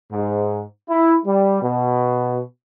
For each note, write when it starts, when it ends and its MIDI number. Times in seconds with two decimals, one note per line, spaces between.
0.12 0.61 44
0.89 1.15 64
1.26 1.57 55
1.62 2.40 47